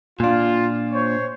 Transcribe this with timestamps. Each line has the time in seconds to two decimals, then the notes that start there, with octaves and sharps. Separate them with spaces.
0.20 A#2 D4 F4
0.93 C5 C#5